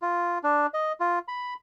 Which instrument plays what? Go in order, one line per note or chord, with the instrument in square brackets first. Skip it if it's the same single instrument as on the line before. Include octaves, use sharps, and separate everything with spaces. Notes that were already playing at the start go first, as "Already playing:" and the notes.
[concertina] F4
D4
D#5
F4
B5